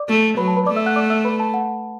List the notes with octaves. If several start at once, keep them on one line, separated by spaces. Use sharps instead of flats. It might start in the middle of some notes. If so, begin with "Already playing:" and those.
Already playing: D5 D6
A3
F#3 B4 B5
A5
B4 B5
A3 D5 D6
E5 E6
F#5 F#6
D5 D6
E5 E6
B4 B5
A5
F#5